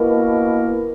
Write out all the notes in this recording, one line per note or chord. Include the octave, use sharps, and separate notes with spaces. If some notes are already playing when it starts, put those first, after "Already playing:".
Already playing: B2 A#3 E4 A#4